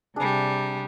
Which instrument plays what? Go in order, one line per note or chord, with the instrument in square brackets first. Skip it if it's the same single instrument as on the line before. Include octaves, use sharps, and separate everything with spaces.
[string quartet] C3 G3 [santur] D4 G#4